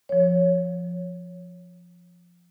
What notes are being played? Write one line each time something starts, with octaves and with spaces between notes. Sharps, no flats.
F3 C#5